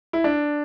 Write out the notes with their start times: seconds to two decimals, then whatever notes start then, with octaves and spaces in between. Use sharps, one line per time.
0.13 E4
0.24 D4